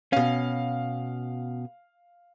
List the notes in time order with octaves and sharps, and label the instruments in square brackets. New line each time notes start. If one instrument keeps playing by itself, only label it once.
[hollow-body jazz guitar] B2 C#4 [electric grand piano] F5